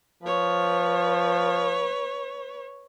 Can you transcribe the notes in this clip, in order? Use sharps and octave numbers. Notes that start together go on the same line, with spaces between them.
F3 B4 C#5